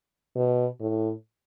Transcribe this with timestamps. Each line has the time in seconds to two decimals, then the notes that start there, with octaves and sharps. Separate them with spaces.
0.36 B2
0.80 A2